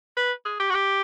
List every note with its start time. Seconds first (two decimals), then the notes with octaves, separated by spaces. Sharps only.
0.17 B4
0.45 G#4
0.60 G4
0.70 F#4
0.74 G4